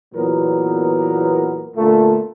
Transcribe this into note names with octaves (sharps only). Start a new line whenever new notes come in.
E2 A#2 F#3 B3 A#4
A#2 D3 A3